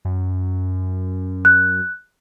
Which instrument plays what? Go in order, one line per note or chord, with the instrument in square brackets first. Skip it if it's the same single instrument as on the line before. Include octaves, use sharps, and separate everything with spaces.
[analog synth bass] F#2
[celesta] F#6